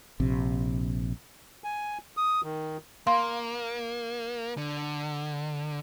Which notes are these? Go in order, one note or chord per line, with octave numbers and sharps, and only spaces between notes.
A#1 C3
G#5
D#6
D#3
A#3 F5 C6
D3